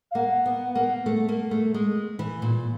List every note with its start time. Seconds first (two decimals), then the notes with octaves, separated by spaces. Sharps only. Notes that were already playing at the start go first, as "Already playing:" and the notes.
0.11 F5
0.15 A#3 F#5
0.46 B3
0.75 A#3
1.06 A3
1.29 A#3
1.51 A3
1.74 G#3
2.19 E3
2.42 A#2